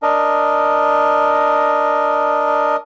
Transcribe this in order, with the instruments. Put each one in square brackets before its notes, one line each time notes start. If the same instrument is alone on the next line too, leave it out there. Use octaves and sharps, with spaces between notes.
[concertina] D4 A#4 D#5